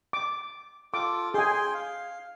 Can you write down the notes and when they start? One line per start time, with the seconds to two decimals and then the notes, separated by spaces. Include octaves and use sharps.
0.13 D6
0.94 F4 A4 D6
1.34 G#4 G5 G#5 C6
1.74 F5